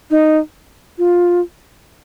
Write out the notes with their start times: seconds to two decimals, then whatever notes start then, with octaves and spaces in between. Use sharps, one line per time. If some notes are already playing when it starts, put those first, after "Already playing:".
0.10 D#4
0.98 F4